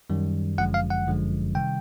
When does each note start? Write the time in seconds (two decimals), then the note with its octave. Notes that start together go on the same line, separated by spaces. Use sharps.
0.10 F#2 D#3 G3
0.58 G1 F#2 D3 F3 G#3 F#5
0.74 F5
0.90 F#5
1.07 G1 F#2 D3 F3 G#3
1.55 C3 D#3 G3 G5